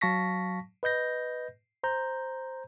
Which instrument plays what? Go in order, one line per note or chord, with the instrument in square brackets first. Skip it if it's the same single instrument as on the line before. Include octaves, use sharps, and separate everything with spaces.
[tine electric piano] F#3 F5 A5 C#6 A#6 B6
B4 D#5 G6 A#6
C5 A#5 G6